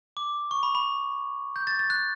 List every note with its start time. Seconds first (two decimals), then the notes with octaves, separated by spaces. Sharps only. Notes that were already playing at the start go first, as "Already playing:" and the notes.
0.17 D6
0.51 C#6
0.63 B5
0.75 B5
1.56 G6
1.67 A6
1.79 A6
1.90 F#6